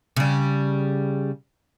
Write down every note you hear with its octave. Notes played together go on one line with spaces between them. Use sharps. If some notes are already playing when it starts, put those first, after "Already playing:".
C#3 G3